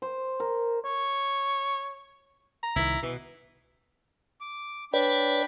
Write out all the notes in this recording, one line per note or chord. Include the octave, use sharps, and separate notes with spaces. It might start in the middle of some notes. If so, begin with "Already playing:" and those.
C5
A#4
C#5
A#5
C2 D#3 E4
B2 E3
D6
D4 B4 C#5 D5 G5 B5